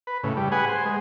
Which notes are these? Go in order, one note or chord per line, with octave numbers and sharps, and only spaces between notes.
B4
A2 C#3
G3
G#4 B4 F#5 G#5
C5
G#3